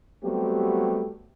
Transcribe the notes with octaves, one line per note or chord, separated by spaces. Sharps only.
F#3 G3 A3 B3 C4 G4